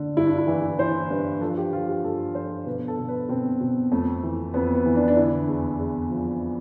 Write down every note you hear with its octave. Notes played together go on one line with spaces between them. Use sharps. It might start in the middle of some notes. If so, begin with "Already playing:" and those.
Already playing: D3
G2 E4
D4
E4
E3
E3 C5
G2 B4
F3 A4
G4
F3 F4
G4
G2 A4
F3 C5
B2 B4
A4
B2
B4
B2 C4
B2
F2 A3
E3
F2 B3
B3
E3
D4
D4
D3 E4
E2
E2
F3